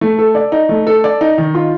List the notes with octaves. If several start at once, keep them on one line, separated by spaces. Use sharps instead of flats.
A3
A4
D5
D#4
A3
A4
D5
D#4
D#3
F4